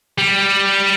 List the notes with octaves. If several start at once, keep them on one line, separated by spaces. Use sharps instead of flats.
G3